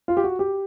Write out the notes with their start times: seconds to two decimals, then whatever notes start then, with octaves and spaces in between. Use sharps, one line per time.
0.08 F4
0.17 G4
0.24 F#4
0.39 G4